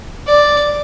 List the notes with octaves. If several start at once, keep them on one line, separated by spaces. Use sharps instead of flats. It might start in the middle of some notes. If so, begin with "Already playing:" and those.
D5